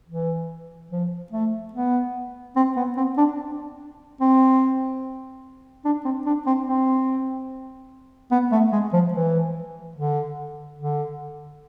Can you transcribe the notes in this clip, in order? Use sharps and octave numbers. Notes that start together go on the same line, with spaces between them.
E3
F3
A3
B3
C4
B3
C4
D4
C4
D4
C4
D4
C4
C4
B3
A3
G#3
F3
E3
D3
D3